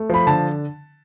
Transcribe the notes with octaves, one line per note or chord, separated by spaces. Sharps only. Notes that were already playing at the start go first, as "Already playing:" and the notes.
Already playing: A3
F3 B5
D3 A5